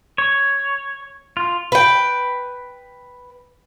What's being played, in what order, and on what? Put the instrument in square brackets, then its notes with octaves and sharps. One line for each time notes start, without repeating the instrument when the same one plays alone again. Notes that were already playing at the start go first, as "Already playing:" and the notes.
[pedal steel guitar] C#5
F4
[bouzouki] B4 G5